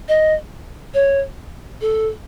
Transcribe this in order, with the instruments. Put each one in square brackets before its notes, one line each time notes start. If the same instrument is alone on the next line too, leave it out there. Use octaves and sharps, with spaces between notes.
[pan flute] D#5
C#5
A4